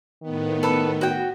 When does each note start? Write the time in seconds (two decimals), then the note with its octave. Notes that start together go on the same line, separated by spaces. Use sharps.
0.23 A2 D#3 B3
0.63 A4 B4
1.01 F#4 G5